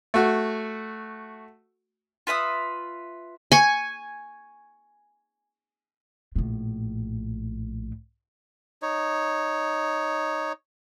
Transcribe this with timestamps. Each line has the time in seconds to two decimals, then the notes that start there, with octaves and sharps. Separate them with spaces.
0.14 A3 F#4
2.27 F4 B4 E5 D#6
3.52 G#5 C#6
6.36 A#1 A2
8.82 D#4 C#5